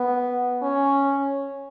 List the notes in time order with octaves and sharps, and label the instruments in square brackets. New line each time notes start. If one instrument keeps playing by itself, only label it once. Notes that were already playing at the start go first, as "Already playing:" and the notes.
Already playing: [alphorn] B3
C#4